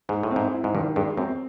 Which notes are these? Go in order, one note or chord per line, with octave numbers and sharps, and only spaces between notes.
G#2 G#3
A2
C4
G#2
E4
G#2
G2 D#3
G2 G#3
F#2 C4